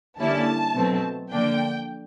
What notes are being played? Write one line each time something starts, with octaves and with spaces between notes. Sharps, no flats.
D3 G3 A#3 C#4 E4 A5
B2 F#3 A3 C4
D3 F3 A#3 D4 G5